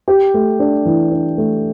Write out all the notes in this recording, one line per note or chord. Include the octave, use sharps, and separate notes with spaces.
G4
A3
D4
E3
D4
A3